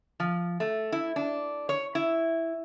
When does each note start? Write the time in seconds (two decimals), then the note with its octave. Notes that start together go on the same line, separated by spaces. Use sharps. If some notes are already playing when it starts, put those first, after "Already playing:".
0.20 F3
0.60 A3
0.92 E4
1.16 D4
1.69 C#5
1.95 E4